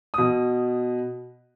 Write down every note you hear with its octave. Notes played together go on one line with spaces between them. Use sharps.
B2 D#6